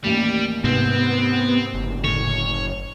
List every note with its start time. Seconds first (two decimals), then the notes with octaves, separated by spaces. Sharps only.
0.04 A1 D#2 G3
0.64 G#2 C3 B3 C4
1.74 F#1
2.04 A2 D3 C#5